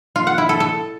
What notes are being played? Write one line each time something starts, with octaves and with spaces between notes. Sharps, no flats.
F4
F#5
E4
A4
A4